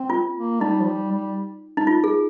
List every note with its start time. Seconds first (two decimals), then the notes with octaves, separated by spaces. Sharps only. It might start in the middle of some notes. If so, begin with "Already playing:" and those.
Already playing: C4
0.10 F4
0.36 A#3
0.60 G3 D#4
0.80 F3
0.86 G3
1.11 G3
1.77 D#4
1.87 F4
2.04 G#4